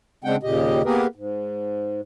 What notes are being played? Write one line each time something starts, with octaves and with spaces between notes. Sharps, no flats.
C#3 G#3 C4 D4 F#5 G5
D#2 A#2 C#3 G4 D#5
A#3 B3 G4 G#4 A#4 B4
G#2